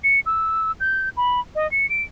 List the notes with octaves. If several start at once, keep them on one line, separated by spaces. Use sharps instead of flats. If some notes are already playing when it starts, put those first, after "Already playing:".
C#7
E6
G6
B5
D#5
C#7
D7